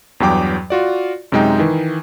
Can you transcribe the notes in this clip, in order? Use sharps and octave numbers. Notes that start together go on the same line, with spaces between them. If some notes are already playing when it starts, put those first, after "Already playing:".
E2 G2 F#3 G5 D6
F4 F#4 D5
F#2 C3 G#3 D#4 G5
D#3 E3